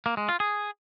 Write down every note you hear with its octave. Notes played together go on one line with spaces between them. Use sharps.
A#3
G#3
F4
G#4